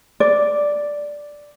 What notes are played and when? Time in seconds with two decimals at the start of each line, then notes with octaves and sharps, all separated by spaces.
0.20 D5